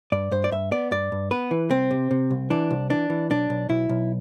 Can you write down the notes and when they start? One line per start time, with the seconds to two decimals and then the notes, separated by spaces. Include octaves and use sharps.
0.12 G2 D5
0.31 G2 C5
0.44 D5
0.52 G2 E5
0.71 B3 D5
0.91 G2 D5
1.12 G2
1.31 B3 B4
1.51 E3
1.71 C2 C4
1.91 C3
2.11 C3
2.31 C2
2.50 E3 D4
2.71 C2
2.90 E3 D4
3.10 E3
3.30 B1 D4
3.50 B1
3.69 B1 E4
3.89 B1